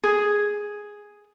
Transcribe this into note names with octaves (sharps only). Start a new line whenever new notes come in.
G#4